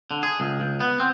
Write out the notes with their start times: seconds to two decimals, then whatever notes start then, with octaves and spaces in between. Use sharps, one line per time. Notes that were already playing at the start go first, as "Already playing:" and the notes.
0.11 D3
0.23 G#4
0.40 C#2
0.60 C#2
0.80 B3
1.00 C4